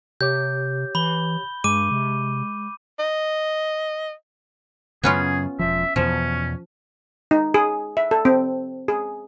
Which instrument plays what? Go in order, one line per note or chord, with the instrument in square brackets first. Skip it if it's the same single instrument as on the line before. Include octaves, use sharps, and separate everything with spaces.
[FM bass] C3 [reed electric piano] G4 C#5 D6 [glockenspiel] G6
[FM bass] E3 [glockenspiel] B5 G7
[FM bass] G2 [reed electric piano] G#3 [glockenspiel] D6 D#7
[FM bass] C3
[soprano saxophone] D#5
[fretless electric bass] F#2 C#3 [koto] B3 C#4 F4 [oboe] G#4
[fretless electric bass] E1 F3 [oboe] E5
[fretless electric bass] E2 B2 [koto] F3 [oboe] C#4
[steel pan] D#4
G#4
E5
A4
C4
G#4